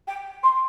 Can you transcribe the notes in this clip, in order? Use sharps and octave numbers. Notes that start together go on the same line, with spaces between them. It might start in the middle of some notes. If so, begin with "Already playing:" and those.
G5
C6